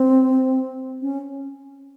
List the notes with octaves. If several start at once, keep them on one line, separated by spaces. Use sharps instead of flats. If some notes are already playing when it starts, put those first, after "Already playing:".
Already playing: C4
C#4